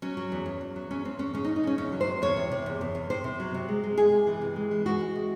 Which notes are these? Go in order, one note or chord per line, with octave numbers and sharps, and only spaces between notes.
F#3 C#4
F#3
E2
E2
E2
F#3
E2 C#4
E2 C4
E2 C#4
C#3 C#4
D#4
C#3
D#4
C#3 C#4
E2 C#4
F#3
C5
C3
E2 C#5
C3
C3
E2
E2
E2
C3 C5
C3
F#3
C3
G#3
G#3
C3 G#4
C3
E3
C3
G#3
E3
G#3 F#4
G#3
C3